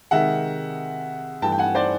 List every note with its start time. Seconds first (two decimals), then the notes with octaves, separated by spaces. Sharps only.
0.11 C3 D#3 G#3 E5 F#5
1.42 G2 E3 A3 G5 A5
1.52 G5
1.58 F#5 G#5
1.75 C5 D5